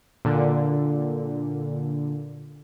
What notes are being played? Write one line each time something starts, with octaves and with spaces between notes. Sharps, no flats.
A#2 D3